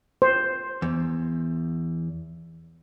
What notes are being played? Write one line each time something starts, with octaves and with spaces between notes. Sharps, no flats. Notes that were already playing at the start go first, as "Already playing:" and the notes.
C5
E2